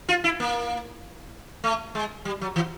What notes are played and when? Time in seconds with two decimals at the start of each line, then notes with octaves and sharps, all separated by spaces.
0.09 F4
0.24 E4
0.40 A#3
1.64 A3
1.95 G#3
2.25 G3
2.41 F#3
2.56 E3